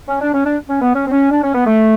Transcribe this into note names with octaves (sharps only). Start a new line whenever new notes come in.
C#4
D4
C#4
D4
C#4
B3
C#4
C4
C#4
D4
C#4
B3
A3